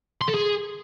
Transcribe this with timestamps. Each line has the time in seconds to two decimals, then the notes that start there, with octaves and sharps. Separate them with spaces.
0.21 C6
0.28 A4
0.34 G#4